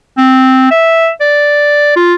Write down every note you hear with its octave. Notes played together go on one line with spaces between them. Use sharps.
C4
E5
D5
F4